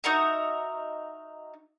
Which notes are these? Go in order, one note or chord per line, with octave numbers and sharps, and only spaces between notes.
D#4 F#4 A#4 E5